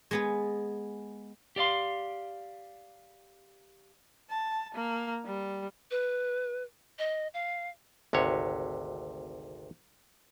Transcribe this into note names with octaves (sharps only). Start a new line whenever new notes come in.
G#3 B3 G#4
G4 D5 F5 C6
A5
A#3
G3
B4
D#5
F5
G#1 D2 C3 C#5